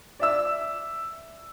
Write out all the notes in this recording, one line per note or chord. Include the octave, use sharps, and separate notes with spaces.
D5 E5 E6